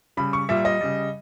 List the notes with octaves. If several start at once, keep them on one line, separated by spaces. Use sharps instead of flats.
C#3 G3 B5
C#6
A#2 G3 E5
D#5
C#3 G3